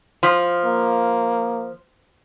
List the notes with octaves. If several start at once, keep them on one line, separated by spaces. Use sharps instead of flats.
F3
A#3